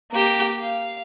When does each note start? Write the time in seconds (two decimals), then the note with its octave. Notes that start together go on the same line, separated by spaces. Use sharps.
0.12 A#3 G4
0.60 F5